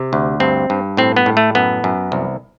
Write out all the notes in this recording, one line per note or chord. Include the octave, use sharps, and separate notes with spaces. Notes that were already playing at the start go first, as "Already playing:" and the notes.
Already playing: C3
D2
G2 C4
G2
A2 C4
B3
A2
A3
F#2 B3
F#2
C2